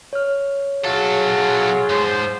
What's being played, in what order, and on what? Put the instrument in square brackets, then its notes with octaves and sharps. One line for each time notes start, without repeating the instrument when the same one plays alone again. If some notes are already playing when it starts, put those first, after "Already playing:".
[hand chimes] C#5 F6
[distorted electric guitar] B1 A4 [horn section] F#3 F4 [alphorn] G#4
[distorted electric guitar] G#2 [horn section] F3 C5